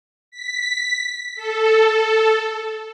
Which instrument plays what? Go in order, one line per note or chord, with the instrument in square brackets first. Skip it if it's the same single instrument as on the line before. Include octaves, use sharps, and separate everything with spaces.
[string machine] B6
A4